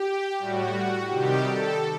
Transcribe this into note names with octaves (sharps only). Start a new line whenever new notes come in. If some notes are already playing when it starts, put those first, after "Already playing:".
Already playing: G4
A2 G3 F#4
C3 D#3 G3 G4
A4